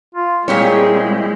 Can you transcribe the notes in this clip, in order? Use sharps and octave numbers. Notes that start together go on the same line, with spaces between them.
F4
A#2 G3 G#3 C4 E4 G4 G#4 C#5